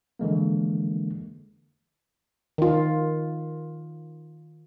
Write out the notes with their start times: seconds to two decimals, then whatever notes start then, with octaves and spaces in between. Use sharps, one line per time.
0.19 D3 E3 G#3 A#3
2.58 D#3 F4